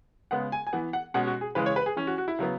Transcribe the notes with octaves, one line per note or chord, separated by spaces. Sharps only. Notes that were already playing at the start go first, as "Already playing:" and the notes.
C#3 G#3 B3 F#5
G#5
G#5
E3 B3 F#5
F#5
B2 G#3 C#4 F#5
F#4
G#4
C#3 E3 G#3 B4
C#5
B4
G#4
E3 C#4
F#4
F#4
E4
C#3 F#3 B3